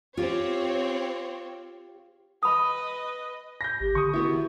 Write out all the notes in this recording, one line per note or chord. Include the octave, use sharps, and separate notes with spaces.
C4 F4 G4 C#5
B4 D#5 B5 D#6
G6 A#6
A1 G4
D3 C#6 D#6
D#3 B3 E4 F#4